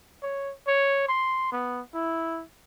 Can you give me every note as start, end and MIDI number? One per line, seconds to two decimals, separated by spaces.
0.23 0.52 73
0.68 1.04 73
1.09 1.47 84
1.52 1.81 59
1.94 2.42 64